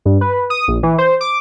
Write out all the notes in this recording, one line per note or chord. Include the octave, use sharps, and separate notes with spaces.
G2
B4
D#6
A#1
E3
C5
D6